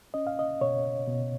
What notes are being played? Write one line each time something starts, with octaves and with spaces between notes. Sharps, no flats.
C#4 D#5
F5
D#5
B2 C#5
B2